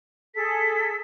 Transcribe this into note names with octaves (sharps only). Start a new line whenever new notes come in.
G#4 A4 B6